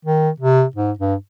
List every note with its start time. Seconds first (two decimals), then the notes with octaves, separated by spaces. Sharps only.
0.05 D#3
0.40 C3
0.75 G#2
0.99 G2